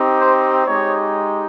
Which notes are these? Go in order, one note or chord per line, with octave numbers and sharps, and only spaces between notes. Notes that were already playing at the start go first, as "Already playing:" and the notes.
Already playing: C4 D#4 G4
C5
G#3 D#4 G4 C#5